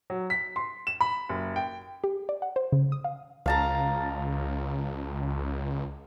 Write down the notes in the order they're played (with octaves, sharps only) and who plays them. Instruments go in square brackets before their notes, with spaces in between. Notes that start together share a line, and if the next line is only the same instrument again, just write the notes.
[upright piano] F#3
B6
C6
E7
B5
F#1
G5
[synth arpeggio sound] G4
D5
F#5
C5
C#3
D#6
F5
[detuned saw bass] C#2 [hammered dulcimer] F5 A5 A#5